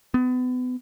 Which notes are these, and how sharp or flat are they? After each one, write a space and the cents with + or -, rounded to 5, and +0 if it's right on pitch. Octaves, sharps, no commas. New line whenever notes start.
B3 +30